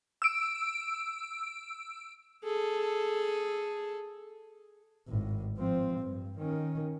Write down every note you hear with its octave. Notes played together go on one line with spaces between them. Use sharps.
E6 D7
G#4 A4
G#1 A2
F3 C4
G2
D#3 C#4